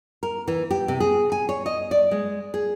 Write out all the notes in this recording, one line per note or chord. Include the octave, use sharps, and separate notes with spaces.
A#4
E3
G4
C3
G#4
G#5
C#5
D#5
D5
G#3
G#4